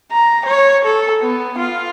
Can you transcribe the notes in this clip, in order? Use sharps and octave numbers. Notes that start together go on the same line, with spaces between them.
A#5
C#5
A4
B3
F4